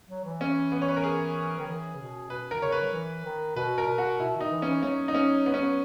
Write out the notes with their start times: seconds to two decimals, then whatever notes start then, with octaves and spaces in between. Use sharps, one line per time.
0.09 F#3
0.25 E3
0.41 C#4
0.72 B3
0.82 C#5
0.88 B4
0.96 A#4
1.04 G#4
1.59 D#3
1.67 E3
1.95 C#3
1.98 B2
2.30 B2 B4
2.51 D#3 A#4
2.62 C#3 C#5
2.72 B4
2.82 F#3
2.93 E3
3.25 D#3
3.56 B2 B4
3.78 A#4
3.87 B2
3.98 F#4
4.20 B2 E4
4.35 D#3
4.41 D#4
4.51 E3
4.62 E3 C#4
4.83 F#3 C#4
5.08 D#4
5.15 C#4
5.46 B3
5.54 C#4
5.62 B3